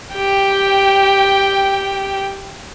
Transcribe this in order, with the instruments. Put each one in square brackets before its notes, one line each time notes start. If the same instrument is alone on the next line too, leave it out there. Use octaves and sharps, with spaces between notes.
[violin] G4 G5